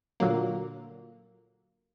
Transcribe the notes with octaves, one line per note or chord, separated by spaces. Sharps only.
A#2 D3 F#3 A#3